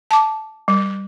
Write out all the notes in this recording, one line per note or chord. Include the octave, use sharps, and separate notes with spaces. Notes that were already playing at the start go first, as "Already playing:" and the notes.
A5 D6
G3